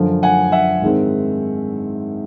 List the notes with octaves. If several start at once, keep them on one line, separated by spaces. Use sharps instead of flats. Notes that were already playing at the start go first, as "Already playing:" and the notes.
Already playing: F#2 D3 F3
F#5 G#5
E5 F#5
G#2 D#3 G#3 C4